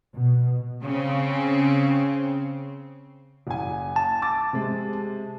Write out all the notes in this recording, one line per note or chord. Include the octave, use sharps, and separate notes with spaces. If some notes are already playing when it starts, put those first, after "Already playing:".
B2
C#3 C4
F#1 G#5
A5
D6 A6
C3 G#3